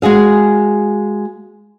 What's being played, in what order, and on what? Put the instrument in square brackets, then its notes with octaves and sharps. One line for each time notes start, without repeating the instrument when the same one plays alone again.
[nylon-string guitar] G#3 F#4 G#4 F5